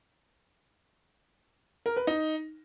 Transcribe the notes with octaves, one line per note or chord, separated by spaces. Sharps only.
A#4
B4
D#4